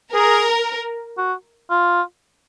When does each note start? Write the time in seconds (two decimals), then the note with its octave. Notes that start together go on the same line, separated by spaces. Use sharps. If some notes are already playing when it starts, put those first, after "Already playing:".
0.13 G#4 A#4
1.17 F#4
1.70 F4